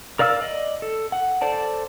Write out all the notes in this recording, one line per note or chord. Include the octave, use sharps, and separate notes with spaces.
A#4 D5 F5 E6 F6
D5 D#5
A4
F#5
A4 C5 D5 A5